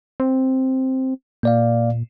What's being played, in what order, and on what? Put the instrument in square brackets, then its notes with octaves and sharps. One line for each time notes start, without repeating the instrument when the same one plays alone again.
[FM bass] C4
[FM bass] A#2 [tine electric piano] A#3 D5 F5